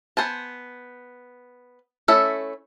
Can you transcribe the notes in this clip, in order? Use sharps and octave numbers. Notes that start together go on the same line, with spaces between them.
B3 C5 G#5 A5
A3 C#4 E4 A4 E5